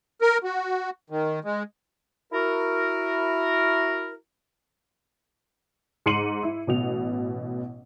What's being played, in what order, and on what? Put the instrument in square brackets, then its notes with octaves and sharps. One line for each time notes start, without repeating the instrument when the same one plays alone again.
[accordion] A#4
F#4
D#3
G#3
[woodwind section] E4 F#4 A#4
[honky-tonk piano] G#2 C6 C7 C#7 D#7 F#7
E4
A1 B2 F7